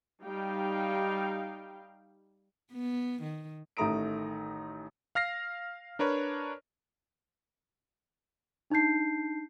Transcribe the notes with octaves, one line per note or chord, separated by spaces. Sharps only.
G3 D#4 F5 G5
B3
D#3
A1 D#3 A3 A#5 D#6 D7
F5 F6 A#6 C7
D4 A#4 B4 C#5
D4 D#4 A5 G6 C7